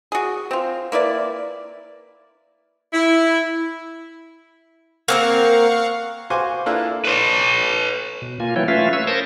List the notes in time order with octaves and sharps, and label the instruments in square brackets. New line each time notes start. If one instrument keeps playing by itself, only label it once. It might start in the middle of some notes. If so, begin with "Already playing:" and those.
[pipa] F#4 G#4
C4 F4
A#3 E4 B4 D5
[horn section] E4
[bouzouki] A#3 C4 A#4 [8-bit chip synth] F5 F#5 C#6
[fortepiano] F#4 C5 F5 G#5 C6 D6
A#3 D4 E4 F4 A4 B4
[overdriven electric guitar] B4 C#5
[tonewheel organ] B2
A#3 F4 G#5
E3 F#3 E4 C#5 G5
A3 C#4 F4 B4 E5 F5
B4 C#5 E6
A#4 C5 A5 C#6 D#6